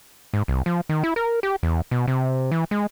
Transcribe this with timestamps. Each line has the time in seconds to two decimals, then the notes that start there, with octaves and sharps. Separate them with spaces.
0.34 G#2
0.48 C2
0.66 F3
0.89 D#3
1.04 E4
1.16 A#4
1.43 G4
1.63 E2
1.91 B2
2.08 C3
2.51 E3
2.71 G#3